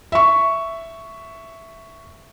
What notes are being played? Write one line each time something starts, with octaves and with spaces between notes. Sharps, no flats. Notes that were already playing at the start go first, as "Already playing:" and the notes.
E5 C#6